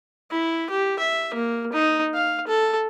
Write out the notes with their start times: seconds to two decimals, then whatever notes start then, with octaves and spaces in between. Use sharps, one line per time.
0.31 E4
0.70 G4
0.99 E5
1.34 A#3
1.73 D#4
2.14 F5
2.47 A4